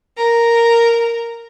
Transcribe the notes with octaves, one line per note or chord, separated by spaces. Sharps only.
A#4